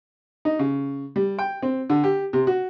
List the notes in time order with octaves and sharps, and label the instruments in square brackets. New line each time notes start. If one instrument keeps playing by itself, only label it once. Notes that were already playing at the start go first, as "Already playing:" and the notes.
[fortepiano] D#4
C#3
G3
G5
C4
D3
G4
C3
F#4